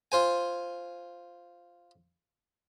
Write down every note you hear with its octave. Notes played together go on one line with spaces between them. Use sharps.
F4 C5 G#5